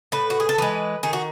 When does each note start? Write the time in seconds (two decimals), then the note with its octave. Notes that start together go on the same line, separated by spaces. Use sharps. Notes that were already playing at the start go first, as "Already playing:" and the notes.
0.12 A2 B4
0.30 F#4
0.40 G#4
0.49 A4
0.58 E3 G#3 B4
1.03 D#3 G#4
1.13 F#4